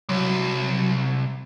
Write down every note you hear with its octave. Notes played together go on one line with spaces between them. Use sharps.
C2 F#3